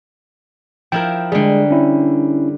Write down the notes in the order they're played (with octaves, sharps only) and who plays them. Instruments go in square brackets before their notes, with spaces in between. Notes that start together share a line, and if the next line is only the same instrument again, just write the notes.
[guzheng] F3 E4 A#4 [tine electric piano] G5
[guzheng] D3 G3 [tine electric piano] G#3 G#4
[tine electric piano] C#4 E4